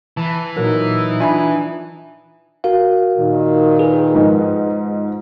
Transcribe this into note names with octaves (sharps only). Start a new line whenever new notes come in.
E3 A5 B5
A#2 F#3 D#4 A#4
D4 F4 E5 G#5 B5
F#4 A#4 F5
A#2 D#3
G#4 B4
G#2 F3 D#4